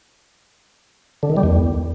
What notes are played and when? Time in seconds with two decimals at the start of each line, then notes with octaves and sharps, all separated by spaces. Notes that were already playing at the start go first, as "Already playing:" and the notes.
1.23 D3
1.30 D#3
1.37 G3
1.43 E2